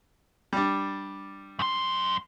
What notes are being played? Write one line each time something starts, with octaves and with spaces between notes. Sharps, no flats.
G3 D4
F#2 C6